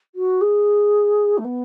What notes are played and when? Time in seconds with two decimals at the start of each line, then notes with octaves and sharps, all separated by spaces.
0.15 F#4
0.41 G#4
1.38 A3
1.44 B3